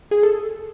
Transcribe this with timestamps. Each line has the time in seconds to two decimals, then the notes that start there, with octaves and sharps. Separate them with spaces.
0.11 G#4
0.23 A4